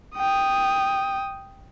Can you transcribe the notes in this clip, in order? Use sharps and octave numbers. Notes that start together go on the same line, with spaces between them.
G5 D#6